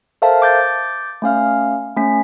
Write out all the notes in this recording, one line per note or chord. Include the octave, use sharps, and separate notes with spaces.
A4 A#4 C5 E5 F5 A5
D6 G6 A6
A3 C#4 F5 F6
A3 C#4 B6